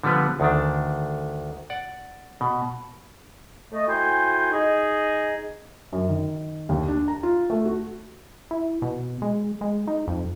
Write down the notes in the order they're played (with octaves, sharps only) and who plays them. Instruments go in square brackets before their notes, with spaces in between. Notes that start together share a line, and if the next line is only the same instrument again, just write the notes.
[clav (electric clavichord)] D3 F3 G3 B3 B4
D2 D#3 D4
D5 F#5
B2
[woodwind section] A3 D#5
A3 E4 F#4 C5 G5 G#5
D#4 G#4 D#5
[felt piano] F#2
D#3
D#2
D4
A#5
F4
A3
F#4
[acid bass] E4
B2
G#3
G#3
D#4
F2